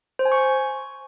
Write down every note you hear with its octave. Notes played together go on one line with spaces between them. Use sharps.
C5
G#5
C#6